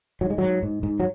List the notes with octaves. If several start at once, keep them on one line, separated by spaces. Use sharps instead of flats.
G#2 F#3
G#3
G#2 F#3
G#2
G#2
F#3